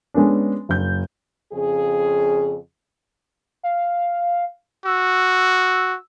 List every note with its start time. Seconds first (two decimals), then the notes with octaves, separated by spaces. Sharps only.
0.14 G#3 B3 C#4 D4
0.69 F#1 G6
1.53 F2 C#3 G#4
3.63 F5
4.85 F#4 E6